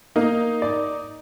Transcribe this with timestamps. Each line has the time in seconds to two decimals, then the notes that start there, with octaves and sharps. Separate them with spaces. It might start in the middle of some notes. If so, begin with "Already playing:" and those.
0.16 A#3 D#4
0.62 D5